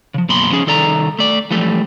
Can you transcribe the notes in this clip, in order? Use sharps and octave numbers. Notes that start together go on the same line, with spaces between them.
C#3 F3
F#2 B2 A#3 B5 C6
F3 C#4 G#4
C2 D#3 A4 D5 A#5
A3 D5
E3 F3 G3 A3